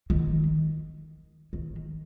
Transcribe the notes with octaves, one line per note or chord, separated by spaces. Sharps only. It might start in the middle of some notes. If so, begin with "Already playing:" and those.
D#3
D#3